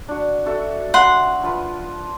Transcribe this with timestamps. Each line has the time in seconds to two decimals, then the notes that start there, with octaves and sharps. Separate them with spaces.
0.08 D4 F#4
0.46 F#4 A4 E5
0.94 E5 F#5 A#5 C6
1.43 F3 F4 B4